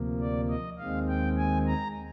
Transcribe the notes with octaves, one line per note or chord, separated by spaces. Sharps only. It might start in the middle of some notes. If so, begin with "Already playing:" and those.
Already playing: D2 C3 F3 A#3
D5
D#5
D#2 D#3 G#3 C4 F5
G5
G#5
A#5